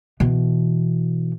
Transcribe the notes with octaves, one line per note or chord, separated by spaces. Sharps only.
B2 E3